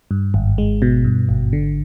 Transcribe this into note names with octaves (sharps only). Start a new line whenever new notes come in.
G2
G#1
G#3
B2
G2
G#1
D3